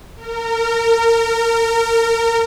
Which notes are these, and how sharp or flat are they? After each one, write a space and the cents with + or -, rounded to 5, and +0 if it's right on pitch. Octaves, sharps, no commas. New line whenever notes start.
A#4 -25